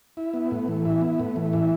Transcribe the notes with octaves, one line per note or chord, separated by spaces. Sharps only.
E4
B3
A2
E3
E4
B3
A2
E3
E4